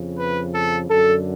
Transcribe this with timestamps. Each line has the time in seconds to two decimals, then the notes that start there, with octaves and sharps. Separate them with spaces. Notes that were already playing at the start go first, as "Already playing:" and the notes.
Already playing: F2 C#3
0.18 B4
0.54 A4
0.90 F#2 D3 A4